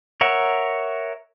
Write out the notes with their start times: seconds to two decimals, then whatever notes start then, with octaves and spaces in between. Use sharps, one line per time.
0.21 A#4 C#5 E5 F#5